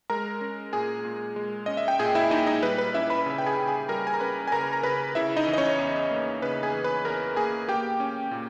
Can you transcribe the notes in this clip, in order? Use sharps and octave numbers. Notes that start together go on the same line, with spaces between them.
G#3 A#4 A#5
C#4
A#2 G#4 G#5
A#2
G#3
C#4 D#5
E5
G5
A#2 G#4 G#5
E4 E5
A#2 D#4 D#5
D#4 D#5
G3 B4
B4
C#4 E4 E5
B4 B5
C#3 E5
G5
G#4 G#5
C#3
G#4 G#5
G3 A#4 A#5
G#5
A#5
C#4 B4 B5
G#5
C#3 A#4 A#5
A#5
C#3 B4 B5
C#3 E4 E5
D#4 D#5
E3
D#5
C#4 C#5
E2
A#3
C#3 B4
G#4 G#5
E3
B4 B5
E2 A#4 A#5
A#3 G#4 G#5
A#3 G4 G5
C#4
A#2